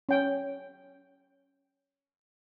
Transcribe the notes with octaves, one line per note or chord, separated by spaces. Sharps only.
C#4 G5